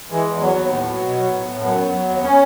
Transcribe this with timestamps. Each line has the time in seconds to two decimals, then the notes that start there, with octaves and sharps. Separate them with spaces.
0.10 E3 G#3
0.26 E2
0.41 F#3 B3
0.56 D#2
0.70 A2
0.86 F#3
1.02 B2
1.16 F#3
1.32 A2
1.47 A2
1.62 F#2 B3
1.77 F#3
1.93 F#3
2.08 D#2
2.23 C#4